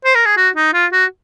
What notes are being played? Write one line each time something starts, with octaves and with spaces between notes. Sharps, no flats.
C5
A#4
G#4
F#4
D#4
F4
F#4